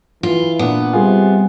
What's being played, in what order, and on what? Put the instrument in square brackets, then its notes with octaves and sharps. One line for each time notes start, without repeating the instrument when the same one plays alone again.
[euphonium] E3 [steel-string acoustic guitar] F4
[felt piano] A#2 D4 [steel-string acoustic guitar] B3
[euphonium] C3 [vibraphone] G3 G#5 [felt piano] F4 G#4